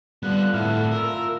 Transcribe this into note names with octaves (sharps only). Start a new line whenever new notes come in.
D3 G3 B3 F4 F#6
A2 E4 F#4 A4 F6
F4 A#4 E6